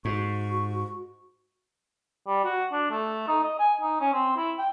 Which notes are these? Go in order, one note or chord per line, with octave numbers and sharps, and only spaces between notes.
G#2 F#4 C#6
G3
F#4
D4
A3
D#4
D#5
G#5
D#4
C#4
C4
E4
G5